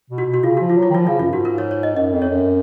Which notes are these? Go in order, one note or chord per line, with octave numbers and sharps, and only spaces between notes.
B2
F#4
B2
F#4
C#3 F4
F3 F#4
F4
F#3
F4
D#3
F3 F4
C#3 F4
F#2 F4
G#2 F#4
A#4
C#5
C#5
D#5
F#2 D#5
F2
C#5
F#2